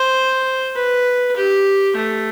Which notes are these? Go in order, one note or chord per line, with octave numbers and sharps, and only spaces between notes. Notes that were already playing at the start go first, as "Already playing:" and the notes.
Already playing: C5
B4
G4
A3